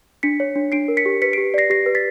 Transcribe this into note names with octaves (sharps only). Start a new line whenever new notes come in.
D4 B6 C#7
C#5
D4
D4 C7 D7
A#4
B6 C#7
G4
B4 B6 C#7
G4 C7 D7
D5 A#6 C7
G4 A#6 C7
B4
A6 B6